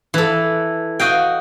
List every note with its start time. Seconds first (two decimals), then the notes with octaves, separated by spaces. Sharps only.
0.14 E3 A4
1.00 F#4 D#5 F5 G5